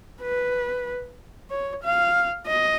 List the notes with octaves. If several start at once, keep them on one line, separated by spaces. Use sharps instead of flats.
B4
C#5
F5
D#5